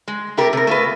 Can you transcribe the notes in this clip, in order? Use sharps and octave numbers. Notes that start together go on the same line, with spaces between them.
G#3
C3 A3 G4 A#4
C3 A#4
A3 F4 B4